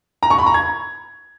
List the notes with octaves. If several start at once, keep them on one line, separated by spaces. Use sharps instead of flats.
A#5
C#6
B5
A#5
G#6